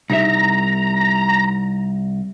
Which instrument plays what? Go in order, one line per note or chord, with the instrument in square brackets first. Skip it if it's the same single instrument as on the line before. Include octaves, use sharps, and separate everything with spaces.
[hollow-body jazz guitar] C2 D#4 E5 [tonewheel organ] A#5